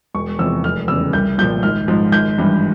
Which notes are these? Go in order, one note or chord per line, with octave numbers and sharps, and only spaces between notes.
E1 C#6
E2 C3 F3 E6
F1 F6
E2 C#3 E6
C2 G6
A#2 F3 G6
G#1 F6
G#2 F3
G#1 G6
G2 E3